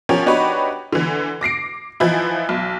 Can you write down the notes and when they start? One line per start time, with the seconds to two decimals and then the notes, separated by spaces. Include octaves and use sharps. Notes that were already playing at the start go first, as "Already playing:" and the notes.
0.09 F3 C#4 G4 A#4 C#5
0.26 D4 D#4 F#4 G4 B4 C#5
0.93 D3 E3
1.41 D6 A#6 C7 D7
2.00 E3 F3 D#4 E4
2.49 B1